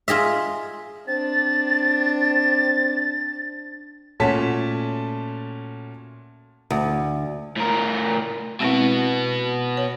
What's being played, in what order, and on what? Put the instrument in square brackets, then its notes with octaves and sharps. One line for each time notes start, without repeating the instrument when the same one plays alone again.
[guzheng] F4 G#4 D#5 E5
[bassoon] C4 [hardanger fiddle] D4 [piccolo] A6
[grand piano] A#2 A3 C#4 F#4 A5 B6
[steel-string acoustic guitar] D2
[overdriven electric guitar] A2 A#4
[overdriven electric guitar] B2 B3 [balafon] G#3 C4 E4
[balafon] C#5